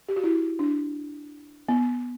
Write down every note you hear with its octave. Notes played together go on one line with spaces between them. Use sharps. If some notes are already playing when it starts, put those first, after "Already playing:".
G4
F#4
E4
D4
B3